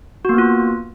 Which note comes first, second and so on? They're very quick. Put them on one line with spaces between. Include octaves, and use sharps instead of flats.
F#4 A#3 B3 F4